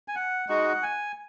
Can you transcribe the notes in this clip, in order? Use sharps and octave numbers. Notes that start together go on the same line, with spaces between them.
G#5
F#5
G#3 D#4 F#4 F#5
G#5